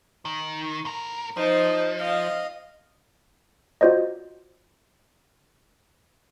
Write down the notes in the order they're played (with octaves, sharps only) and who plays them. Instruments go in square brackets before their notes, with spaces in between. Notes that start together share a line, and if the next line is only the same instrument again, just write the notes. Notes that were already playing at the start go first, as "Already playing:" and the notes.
[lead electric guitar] D#3
A2 A#4
[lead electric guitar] F3 [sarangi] D#4 [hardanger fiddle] C5
[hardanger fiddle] D#5 [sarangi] F5
[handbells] F4 F#4 C5 D5 D#5